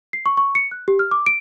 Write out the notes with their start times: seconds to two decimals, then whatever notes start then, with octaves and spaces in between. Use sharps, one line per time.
0.13 C7
0.26 C#6
0.37 C#6
0.55 C#7
0.71 F#6
0.88 G4
0.99 F6
1.11 D6
1.26 D7